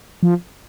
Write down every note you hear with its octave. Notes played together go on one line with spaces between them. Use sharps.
F3